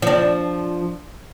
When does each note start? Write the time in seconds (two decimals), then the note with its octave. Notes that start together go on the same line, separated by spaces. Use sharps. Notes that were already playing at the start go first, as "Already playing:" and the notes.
0.02 F3 D4